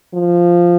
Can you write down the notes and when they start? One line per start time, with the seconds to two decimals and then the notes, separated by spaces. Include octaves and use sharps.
0.15 F3